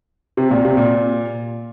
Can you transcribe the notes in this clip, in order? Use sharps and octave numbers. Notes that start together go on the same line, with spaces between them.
C3
A#2
C3
A#2